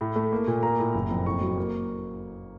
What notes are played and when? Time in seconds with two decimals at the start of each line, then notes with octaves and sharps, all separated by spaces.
0.01 A2
0.16 A3
0.32 A#3
0.47 A#2
0.63 A#3 A#5
0.79 A2
0.95 F#1
1.11 F2
1.26 A2 C#6
1.41 F#3
1.57 A#3